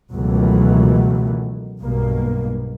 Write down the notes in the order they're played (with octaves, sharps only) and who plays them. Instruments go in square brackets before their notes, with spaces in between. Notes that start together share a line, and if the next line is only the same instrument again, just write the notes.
[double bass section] C#2 B2 D#3 E3 F#3 A3
B1 G2 B2 A#3